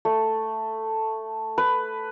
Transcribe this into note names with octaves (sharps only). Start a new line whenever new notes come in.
A3
B4